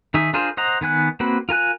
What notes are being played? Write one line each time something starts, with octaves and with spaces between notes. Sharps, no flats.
D#3 D#4 G#4 E5
D4 F4 G#4 A#4 C5
C5 D#5 F#5 A#5
D#3 B3 G#5 F#6
A#3 C4 F#4 B4
F4 A#4 G#5 F#6